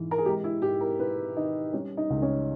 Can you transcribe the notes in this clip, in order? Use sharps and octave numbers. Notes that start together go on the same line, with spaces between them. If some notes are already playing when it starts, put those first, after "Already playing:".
Already playing: G#2 E3
A#4
G#4
G#3 G4
E4
G#2 G4
A#4
G#2 B4
D#3 D#4
G3 C#4
D#4
C#2
C#4